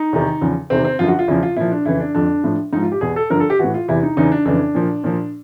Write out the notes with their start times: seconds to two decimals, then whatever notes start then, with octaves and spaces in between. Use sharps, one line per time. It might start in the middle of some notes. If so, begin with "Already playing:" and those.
Already playing: D#4
0.13 E2 C3 D#3
0.41 E2 C#3 F3
0.70 E2 C3 D#3 C4
0.85 C4
0.99 F#2 D3 F3 F4
1.08 F#4
1.19 F4
1.28 E2 C#3 F3 E4
1.43 F4
1.57 A#2 F3 E4
1.72 D4
1.85 F2 C#3 E3 E4
2.00 D4
2.15 F2 D3 F3 D4
2.44 A2 F3
2.73 G#2 F3 D#4
2.83 F4
2.92 G4
3.01 E2 B2 G#4
3.16 A4
3.30 G2 D3 F3 A#4
3.40 A4
3.50 G4
3.59 A2 E3 F#4
3.74 F4
3.88 E2 C3 E3 E4
4.03 D#4
4.17 E2 C#3 E3 D#4
4.32 D4
4.45 F2 C#3 E3 D4
4.75 A#2 F3
5.04 A#2 F3